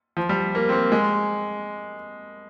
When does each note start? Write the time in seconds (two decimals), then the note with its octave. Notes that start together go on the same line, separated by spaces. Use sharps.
0.17 F3
0.29 G3
0.55 A#3
0.69 C4
0.72 A#3
0.92 G#3